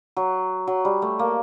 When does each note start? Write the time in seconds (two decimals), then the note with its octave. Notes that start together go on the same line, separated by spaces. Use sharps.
0.17 F#3
0.67 F#3
0.85 G3
1.02 A3
1.19 A#3